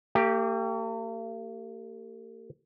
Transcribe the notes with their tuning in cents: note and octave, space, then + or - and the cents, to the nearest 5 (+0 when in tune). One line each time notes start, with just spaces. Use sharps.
A#3 -45 G4 +0